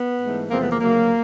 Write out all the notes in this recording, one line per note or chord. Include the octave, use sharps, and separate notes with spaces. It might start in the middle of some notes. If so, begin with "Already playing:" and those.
Already playing: B3
G#2 E3 A3
E2 C3 F3 G#3 A#3 C4
A3 B3
A#3
D2 C#3 F#3 A#3